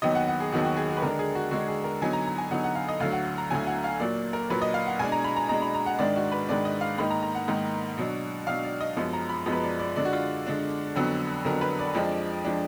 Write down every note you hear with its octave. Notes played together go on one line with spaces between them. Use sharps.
D#2 D#3 F#3 B3 D#4 D#5
F#5
F#5
G#4
D#2 D#3 F#3 B3 D#4 F#4
F#4
G#4
F#4
B4
D3 G#3 D4 A#4
G#4
F#4
D3 G#3 D4 F#4
G#4
A#4
D3 F#3 B3 D#4 G#5
A#5
A#5
G#5
D3 F#3 B3 D#4 F#5
F#5
F5
D#5
D2 D3 F#3 F5
F#5
A#5
D2 D3 F#3 G#5
F#5
F5
A#2 F#3 A#3 D5
A#4
A#2 F#3 A#3 B4
D#5
F5
F#5
B2 G#3 D4 G#5
A#5
B5
A#5
B2 G#3 D4 A#5
B5
A#5
F#5
G#2 D#3 G#3 D4 D5
F#4
B4
G#2 D#3 G#3 D4 D5
D#5
F5
G#2 D#3 A#3 D#4 B5
A#5
A#5
F#5
G#2 D#3 A#3 D#4
B2 F#3 D4
B2 F#3 D4 F5
D5
D#5
F#2 F3 G#3 B3
A#5
B5
F#2 F3 G#3 B3
B4
D5
D5
D3 G#3 D4 D5
F#4
F4
D3 G#3 D4
F2 D3 F#3 B3
F2 D3 F#3 B3 A#4
B4
D5
F2 F3 G#3 D4
F3 G#3 D4